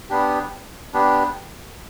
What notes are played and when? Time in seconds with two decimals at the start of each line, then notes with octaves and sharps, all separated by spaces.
0.10 B3 D4 G4
0.94 B3 D4 G4